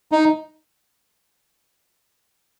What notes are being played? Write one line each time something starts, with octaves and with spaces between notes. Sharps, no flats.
D#4